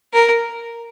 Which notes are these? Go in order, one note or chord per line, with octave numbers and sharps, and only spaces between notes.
A#4